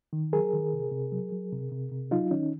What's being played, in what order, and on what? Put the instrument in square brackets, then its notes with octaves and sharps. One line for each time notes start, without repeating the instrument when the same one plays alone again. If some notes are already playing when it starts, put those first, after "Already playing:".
[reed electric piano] D#3
F#3 G#4 A#4
D#3
C3
C3
F#3
F#3
C3
C3
C3
F#3 D#4 F4
D#3 C#4 D#4